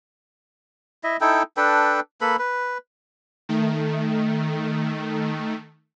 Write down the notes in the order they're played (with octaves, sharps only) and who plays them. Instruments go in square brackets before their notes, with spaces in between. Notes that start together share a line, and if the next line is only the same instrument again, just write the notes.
[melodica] E4 D#5 E5
D#4 E4 A4 G5
D4 A4 B4 G5
A#3 A4 B4 B5
B4
[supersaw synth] D#3 A3